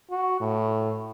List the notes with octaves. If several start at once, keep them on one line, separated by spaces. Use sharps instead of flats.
F#4
A2